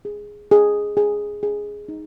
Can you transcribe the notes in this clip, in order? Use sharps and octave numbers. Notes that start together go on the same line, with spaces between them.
G#4
G#4
G#4
G#4
D#4